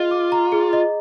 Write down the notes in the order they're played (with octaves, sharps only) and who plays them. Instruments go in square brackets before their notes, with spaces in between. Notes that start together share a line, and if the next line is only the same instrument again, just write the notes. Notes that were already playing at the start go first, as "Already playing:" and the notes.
Already playing: [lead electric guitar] F4 [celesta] G#4 D#5
[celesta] D6
A#5
G#4
D#5